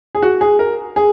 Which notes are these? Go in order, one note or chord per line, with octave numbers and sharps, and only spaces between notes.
G#4
F#4
G#4
A#4
G#4